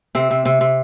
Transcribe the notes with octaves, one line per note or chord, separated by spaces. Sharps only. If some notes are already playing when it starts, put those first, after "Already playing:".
C3 C4
C3
C3
C3